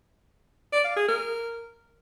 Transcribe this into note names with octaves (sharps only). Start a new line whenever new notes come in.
D5
F5
G#4
A#4